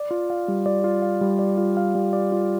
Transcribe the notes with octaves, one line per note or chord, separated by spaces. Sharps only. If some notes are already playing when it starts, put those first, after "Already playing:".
Already playing: D5
F4
F5
G3
D5
F4
F5
G3
D5
F4
F5
G3
D5
F4